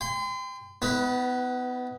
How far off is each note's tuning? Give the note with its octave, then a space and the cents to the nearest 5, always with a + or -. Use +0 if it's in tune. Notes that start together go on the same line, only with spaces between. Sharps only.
G5 +30 C6 -40
B3 +25 E4 -35 B4 +0